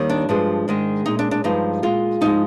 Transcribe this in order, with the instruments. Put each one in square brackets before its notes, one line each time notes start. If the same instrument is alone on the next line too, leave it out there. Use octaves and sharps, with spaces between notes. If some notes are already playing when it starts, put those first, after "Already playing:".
Already playing: [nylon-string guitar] D#2 D#3 G3
D4
G2 F3 G#3
G#2 D#3 G#3
A#2 G#3 D#4
D4
D4
G2 F3 G#3 D#4
A#2 G#3 F4
G#2 F3 G#3 D#4